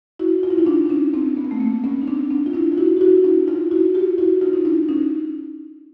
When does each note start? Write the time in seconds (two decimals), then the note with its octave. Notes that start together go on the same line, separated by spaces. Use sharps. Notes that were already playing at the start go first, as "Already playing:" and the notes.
0.19 E4 F#4
0.43 F4
0.51 E4
0.58 D#4 F4
0.66 D4 E4
0.85 D4
0.89 C#4 D#4
1.13 C4 D4
1.37 B3
1.45 C4
1.51 A3 B3
1.60 A#3 C4
1.84 B3 C#4
2.02 D#4
2.07 C4 D4
2.31 C4 D4
2.46 F4
2.53 D4 E4
2.72 F4
2.77 E4 F#4
2.97 G4
3.01 E4 F#4
3.24 D4 E4
3.47 D#4 F4
3.71 E4 F#4
3.94 F4 G4
4.18 E4 F#4
4.41 D#4 F4
4.53 D#4
4.65 D4 E4
4.89 C#4 D#4